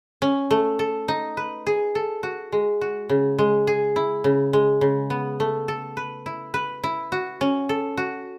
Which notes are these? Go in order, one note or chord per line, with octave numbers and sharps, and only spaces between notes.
C#4
A3
A4
D#4
B4
G#4
A4
F#4
G#3
F#4
C#3
G#3
G#4
E4
C#3
G#3
C#3
B3
A3
A4
B4
E4
B4
E4
F#4
C#4
A4
F#4